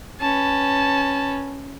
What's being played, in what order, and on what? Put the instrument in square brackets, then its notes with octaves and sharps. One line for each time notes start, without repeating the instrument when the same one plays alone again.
[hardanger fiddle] C#4 B4 [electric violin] A5